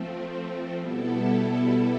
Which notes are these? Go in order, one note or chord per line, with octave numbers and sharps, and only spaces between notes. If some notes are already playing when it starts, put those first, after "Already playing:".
Already playing: F3 A3 C4
B2 G3 B3 E4 A4